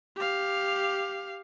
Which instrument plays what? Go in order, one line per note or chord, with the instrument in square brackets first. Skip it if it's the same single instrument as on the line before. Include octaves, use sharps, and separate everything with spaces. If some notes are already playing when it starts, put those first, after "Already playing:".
[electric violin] G4 F5